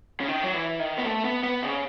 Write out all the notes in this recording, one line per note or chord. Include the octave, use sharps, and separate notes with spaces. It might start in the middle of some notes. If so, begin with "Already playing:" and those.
C#3
D#3
F#3
E3
D#3
B3
A3
B3
B3
C#3